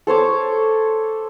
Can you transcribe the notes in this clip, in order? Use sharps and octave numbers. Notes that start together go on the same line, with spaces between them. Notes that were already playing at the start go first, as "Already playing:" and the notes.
A4 C5 C#5 D6